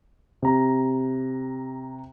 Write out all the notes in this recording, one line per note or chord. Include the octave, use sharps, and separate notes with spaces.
C3 A#5